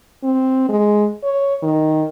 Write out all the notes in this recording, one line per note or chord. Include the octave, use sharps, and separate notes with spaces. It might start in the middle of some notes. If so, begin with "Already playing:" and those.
C4
G#3
C#5
D#3